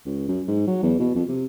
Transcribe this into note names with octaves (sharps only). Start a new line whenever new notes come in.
C#2
F#2
G#2
F#3
E2
B2
F2
C3